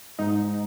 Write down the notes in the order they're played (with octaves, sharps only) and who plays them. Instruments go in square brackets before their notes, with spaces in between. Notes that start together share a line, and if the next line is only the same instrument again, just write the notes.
[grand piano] G#2 [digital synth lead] D#4